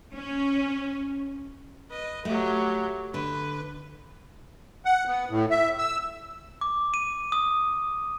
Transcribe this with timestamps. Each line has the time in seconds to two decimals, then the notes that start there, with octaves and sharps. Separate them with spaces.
0.13 C#4
1.90 B4 D#5
2.25 F#3 A3 G4
3.14 D3 B4
4.85 F#5
5.07 B3
5.30 A2
5.50 E5
5.78 E6
6.61 D6
6.94 D#7
7.32 D#6